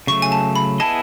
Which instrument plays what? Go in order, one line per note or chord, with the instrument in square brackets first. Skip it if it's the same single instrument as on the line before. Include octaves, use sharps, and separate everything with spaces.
[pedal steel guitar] C#3 F#3 A3 [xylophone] C#6
[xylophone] G#5
A5
B5
[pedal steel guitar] B3 E4 G#4 D#5 [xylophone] A5